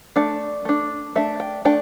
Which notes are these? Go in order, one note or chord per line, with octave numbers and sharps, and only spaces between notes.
A3 D4 D5
A3 D4
A3 D4 E5
G5
A3 D4 G5